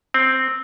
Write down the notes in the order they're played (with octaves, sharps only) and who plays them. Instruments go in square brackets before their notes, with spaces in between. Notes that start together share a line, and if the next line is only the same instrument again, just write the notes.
[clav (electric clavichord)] C4